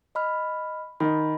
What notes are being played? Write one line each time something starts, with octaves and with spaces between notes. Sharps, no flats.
D#5 B5 F6
D#3 D#5 B5